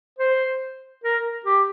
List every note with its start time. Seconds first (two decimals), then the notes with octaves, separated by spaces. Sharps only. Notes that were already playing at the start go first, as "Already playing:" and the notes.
0.19 C5
1.04 A#4
1.46 G4